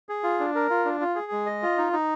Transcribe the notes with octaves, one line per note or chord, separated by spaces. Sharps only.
G#4
F4
D4
A#4
F4
D4
F4
G#4
G#3
D#5
F4
D#4
D#4